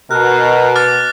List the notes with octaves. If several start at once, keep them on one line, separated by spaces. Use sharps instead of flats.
B2 A#4 F#6
D6 F6 A6